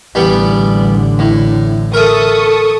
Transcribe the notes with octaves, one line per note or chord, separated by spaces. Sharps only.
A1 E2 D3 G3 B3
A2
A4 A#4 E5 C#6 D#6